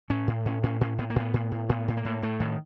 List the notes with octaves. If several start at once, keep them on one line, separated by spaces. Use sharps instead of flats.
A2 C#4
A2
A2 C#4
A2 C#4
A2 C#4
A2 B3
A#3
A2 B3
A2
A2
A2 B3
A2
A#3
A2
A2 A3
A2 D#3